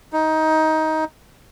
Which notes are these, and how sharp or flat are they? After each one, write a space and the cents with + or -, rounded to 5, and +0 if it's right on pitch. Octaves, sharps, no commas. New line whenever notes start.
D#4 +15